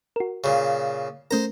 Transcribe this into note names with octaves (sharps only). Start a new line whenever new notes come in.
F#4 A#4
A#2 C#3
A3 C#4 A#4 C5 A#5